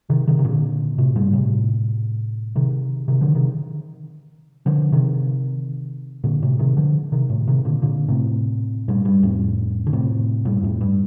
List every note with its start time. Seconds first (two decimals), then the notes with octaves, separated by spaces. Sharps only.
0.10 C3 D#3
0.28 C3 D#3
0.39 C3
0.45 A#2 D3
0.98 A2 C3
1.16 G2 A#2
1.33 A2 C3
2.56 C3 D#3
3.08 C3 D#3
3.21 D3 F3
3.35 C3 D#3
4.66 D3 F3
4.92 C3 D#3
6.24 A#2 D3
6.42 A2 C3
6.59 C3 D#3
6.77 D3 F3
7.12 C3 D#3
7.30 A2 C3
7.47 C3 D#3
7.65 A#2 D3
7.82 A#2 D3
8.08 A2 C3
8.88 G2 A#2
9.05 G2
9.23 F2 A2
9.87 D3
9.93 A2 C3
10.45 G2 A#2
10.63 F2 A2
10.81 G2